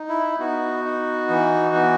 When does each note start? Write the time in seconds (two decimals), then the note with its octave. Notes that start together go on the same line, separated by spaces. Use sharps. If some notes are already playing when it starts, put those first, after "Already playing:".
Already playing: D#4
0.09 E4
0.39 B3 D#4 F#4
0.85 D#4
1.30 E3
1.75 B3